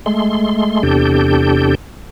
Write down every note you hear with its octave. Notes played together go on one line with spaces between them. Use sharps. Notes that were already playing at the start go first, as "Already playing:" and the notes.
G#3 A3 C6
E2 C3 D4 G4 A4 G6